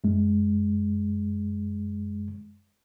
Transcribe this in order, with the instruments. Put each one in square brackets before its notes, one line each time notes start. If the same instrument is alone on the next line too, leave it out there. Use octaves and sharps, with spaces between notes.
[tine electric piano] F#2 G#3